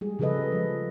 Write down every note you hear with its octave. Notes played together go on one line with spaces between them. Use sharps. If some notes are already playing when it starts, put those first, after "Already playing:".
G3 G#3 G#4
C#3 F3 G#4 A4 B4 D#5
F3 G#3